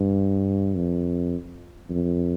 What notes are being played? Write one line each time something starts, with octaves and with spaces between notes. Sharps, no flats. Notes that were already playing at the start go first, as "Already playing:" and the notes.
Already playing: G2
F2
F2